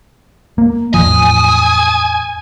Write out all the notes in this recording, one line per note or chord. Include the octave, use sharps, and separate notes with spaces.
A#3
E2 A2 F3 G#5 D#6